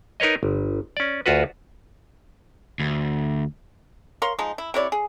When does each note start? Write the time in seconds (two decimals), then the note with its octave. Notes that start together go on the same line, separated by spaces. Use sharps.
0.20 D#4 A#4 B4 C#5 D#5
0.43 G1
0.97 C#4 D5
1.26 D2 F4 F#4 B4
2.79 D2
4.22 A#4 C#5 F5 C6
4.39 F3 G#3 D#4
4.58 E4
4.74 C3 E4 C#5 D5
4.92 G#4